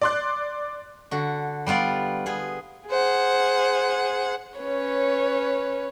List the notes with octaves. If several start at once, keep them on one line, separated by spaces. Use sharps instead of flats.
D5 C6 F#6
D3 F#4
G3 B3 F4 D5
B3 G#4
G#4 C5 F#5
C#4 B4 C#5